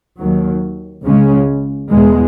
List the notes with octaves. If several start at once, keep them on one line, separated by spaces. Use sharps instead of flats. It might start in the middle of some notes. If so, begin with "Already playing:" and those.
D#2 D#3 F#3
C#2 C#3 G#3 C#4
E2 B2 G#3